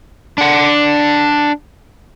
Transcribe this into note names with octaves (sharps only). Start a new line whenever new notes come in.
D4 F#5